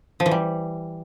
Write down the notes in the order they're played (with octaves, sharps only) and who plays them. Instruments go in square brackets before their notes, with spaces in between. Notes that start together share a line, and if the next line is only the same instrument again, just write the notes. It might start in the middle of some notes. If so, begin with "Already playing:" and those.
[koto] F3
E3
G3